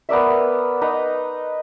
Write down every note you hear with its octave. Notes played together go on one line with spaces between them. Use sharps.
B3 A#4 D5 E5
D#4 B4 D#5 A#5